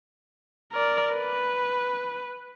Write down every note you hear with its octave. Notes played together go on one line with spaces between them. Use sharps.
A#4 D5
B4